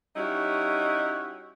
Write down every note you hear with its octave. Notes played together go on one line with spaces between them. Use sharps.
G3 C#4 D#4 E4 F#4 G4